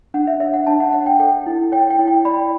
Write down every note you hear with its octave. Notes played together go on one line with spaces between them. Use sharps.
D4 F#5
E5
C#5 E5
F#5
D4 A5
F#5
C#5 F#5
G5
A4 G5
E4
C#5 G5
G5
E4
G5
D5 B5